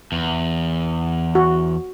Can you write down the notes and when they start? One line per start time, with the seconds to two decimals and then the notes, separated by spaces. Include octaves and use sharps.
0.12 E2
1.35 F#4